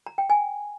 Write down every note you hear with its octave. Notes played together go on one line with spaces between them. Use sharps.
A#5
G5
G#5